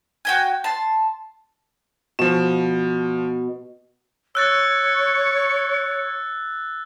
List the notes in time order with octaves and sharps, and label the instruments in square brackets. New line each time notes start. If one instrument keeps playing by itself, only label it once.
[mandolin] F#4 G5 G#5
A5 C6
[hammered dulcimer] B2 [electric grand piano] F3 E7
[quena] C#5 [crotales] E6 F#6 A6